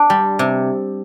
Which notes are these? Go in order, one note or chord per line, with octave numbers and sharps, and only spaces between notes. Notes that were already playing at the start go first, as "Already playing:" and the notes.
Already playing: D4
G3
C3